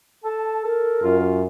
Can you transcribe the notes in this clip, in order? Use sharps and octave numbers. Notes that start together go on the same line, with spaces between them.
A4 A5
A4 A#4
F#2 F4